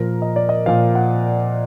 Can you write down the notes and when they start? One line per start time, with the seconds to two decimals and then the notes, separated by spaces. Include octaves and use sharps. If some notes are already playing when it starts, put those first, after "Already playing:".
Already playing: A#2 F3 A#4
0.22 D#5
0.36 D5
0.49 D#5
0.66 A#2 F3 F5
0.95 F#5